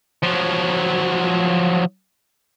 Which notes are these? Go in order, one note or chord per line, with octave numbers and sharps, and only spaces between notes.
F3 F#3